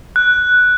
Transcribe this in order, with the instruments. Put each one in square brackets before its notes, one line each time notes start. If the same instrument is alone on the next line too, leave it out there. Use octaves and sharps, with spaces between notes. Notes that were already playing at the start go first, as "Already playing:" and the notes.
[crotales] F#6